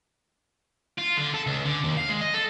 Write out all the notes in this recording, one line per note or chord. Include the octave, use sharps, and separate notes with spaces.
F4
D3
A4
C#2
D3
D#2
F5
G#3
D#5
A4